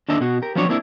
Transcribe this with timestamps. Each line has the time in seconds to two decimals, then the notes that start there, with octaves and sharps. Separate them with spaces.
0.09 D#2 D3 D4 D#5 E5
0.21 B2 F#4
0.42 G4 A#4
0.55 F3 F#3 B3 C4 D4 C#5
0.69 A#3 C4 D4 E4